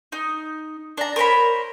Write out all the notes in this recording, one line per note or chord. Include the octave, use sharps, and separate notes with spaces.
D#4
D4 A#5
A#4 C5 C#5 B5